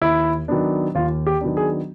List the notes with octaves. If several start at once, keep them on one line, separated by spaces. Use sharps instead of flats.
D#2 E4
D#3 F#3 B3 D4
D#2 F4
G4
D#3 F#3 B3 D4
G#4